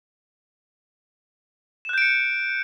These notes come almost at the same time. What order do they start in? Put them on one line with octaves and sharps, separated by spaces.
E7 F#6 G6 D7 C#7